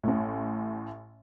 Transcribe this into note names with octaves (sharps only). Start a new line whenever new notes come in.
A1 A2